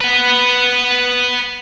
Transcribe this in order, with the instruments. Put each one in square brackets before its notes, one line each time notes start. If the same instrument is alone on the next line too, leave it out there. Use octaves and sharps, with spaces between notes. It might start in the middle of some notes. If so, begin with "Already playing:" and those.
[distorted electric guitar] B4 F#5